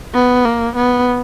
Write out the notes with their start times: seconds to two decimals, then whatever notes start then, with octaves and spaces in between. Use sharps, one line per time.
0.14 B3
0.45 A#3
0.76 B3